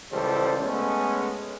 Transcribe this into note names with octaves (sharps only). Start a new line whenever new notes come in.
C#2 E3 G3 A4 C5
G#3 A3 B3 C#4